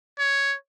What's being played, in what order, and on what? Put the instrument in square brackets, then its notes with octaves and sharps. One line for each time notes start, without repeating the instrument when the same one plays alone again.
[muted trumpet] C#5